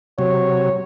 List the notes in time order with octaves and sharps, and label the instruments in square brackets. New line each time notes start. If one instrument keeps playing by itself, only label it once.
[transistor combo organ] C3 F#3 [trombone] C#5